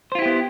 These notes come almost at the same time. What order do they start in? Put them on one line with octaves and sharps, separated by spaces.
C5 F4 E4 G4 B3